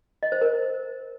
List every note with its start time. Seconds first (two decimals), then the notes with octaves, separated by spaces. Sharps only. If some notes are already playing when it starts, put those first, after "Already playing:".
0.23 D#5
0.32 C5
0.41 A#4